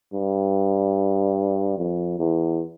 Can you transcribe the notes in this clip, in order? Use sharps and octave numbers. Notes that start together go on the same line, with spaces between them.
G2
F2
E2